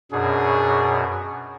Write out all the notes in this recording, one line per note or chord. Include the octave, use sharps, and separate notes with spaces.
F#2 B2 D4 G#4